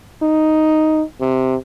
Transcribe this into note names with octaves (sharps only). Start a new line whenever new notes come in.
D#4
C3